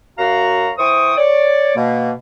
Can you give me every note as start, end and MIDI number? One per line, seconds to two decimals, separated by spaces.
0.18 0.70 42
0.18 0.70 66
0.18 0.70 77
0.18 0.70 82
0.78 1.13 52
0.78 1.13 72
0.78 1.13 79
0.78 1.13 85
0.78 1.13 87
1.17 1.76 73
1.17 1.76 74
1.76 2.11 47
1.76 2.11 58